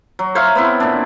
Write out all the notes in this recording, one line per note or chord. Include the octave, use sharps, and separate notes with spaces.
F#3
C5 C#5 E5 F5
B3 C4 E4
A#2 D4